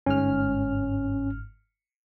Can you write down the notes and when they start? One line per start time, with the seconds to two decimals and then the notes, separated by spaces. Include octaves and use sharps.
0.06 G1 G#2 C#4 F6